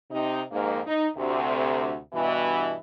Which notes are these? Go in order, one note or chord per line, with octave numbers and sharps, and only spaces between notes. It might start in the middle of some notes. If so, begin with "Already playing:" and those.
C3 D#4
F2 G#2 A#3
D#4
D2 C3
G2 B2 E3